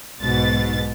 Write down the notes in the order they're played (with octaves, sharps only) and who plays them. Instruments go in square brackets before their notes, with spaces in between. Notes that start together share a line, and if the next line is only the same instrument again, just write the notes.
[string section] B1 G#2 B2 A6